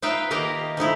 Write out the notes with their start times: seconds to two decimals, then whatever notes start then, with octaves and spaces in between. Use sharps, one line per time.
0.02 D#4 F4 B4 E5 F5 G5
0.31 D#3 A#3 G4 A#4 D#5
0.77 F3 A3 D#4 E4